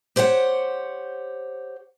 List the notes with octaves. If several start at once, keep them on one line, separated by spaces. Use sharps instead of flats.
G4 C5 C#5 E5 F#5